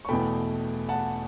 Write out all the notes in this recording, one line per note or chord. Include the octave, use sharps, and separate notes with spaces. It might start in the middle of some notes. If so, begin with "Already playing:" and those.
C#6
E2 B2 A3 G5 B5
F#5 A5